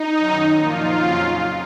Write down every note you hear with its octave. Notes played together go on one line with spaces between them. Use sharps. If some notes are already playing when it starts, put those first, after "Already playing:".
Already playing: D#4
F#2 D#3 F#3
A#2 F3 A#3 F4
F2 C#3 F#3 C#4